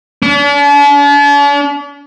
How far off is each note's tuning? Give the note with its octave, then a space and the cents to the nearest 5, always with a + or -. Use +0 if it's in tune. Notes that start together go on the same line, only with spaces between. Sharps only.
D4 -45